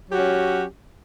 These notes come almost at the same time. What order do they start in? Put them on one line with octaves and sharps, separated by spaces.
F#3 G4 F#4 C#4